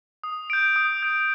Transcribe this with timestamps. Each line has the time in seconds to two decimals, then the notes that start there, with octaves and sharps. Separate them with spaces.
0.24 D#6
0.50 G6 D7
0.76 D#6
1.03 G6 D7